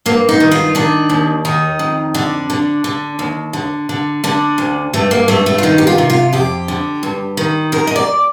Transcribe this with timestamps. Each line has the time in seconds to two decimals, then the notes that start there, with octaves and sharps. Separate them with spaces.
0.06 G2 A#3
0.29 D#4
0.40 D#3
0.51 F4
0.75 D#3 D4
1.10 D#2
1.45 D#3 D#4
1.79 F2
2.14 D3 D4
2.50 D3
2.84 D3
3.19 D#2
3.53 D3
3.89 D3
4.24 D3 D4
4.58 D2
4.93 G2 A3
5.11 A#3
5.28 G2 A3
5.46 A3
5.58 F4
5.63 D#3 D#4
5.78 G4
5.87 F4
5.98 C3
6.10 F4
6.33 F2 G4
6.68 D3
7.03 G2
7.37 D#3
7.72 D#2 A#4
7.87 D#5
7.96 D5